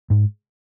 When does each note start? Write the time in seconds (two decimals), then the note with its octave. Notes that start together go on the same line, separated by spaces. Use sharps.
0.10 G#2